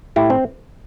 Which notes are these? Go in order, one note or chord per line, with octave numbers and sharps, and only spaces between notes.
A2 E4 G4
C4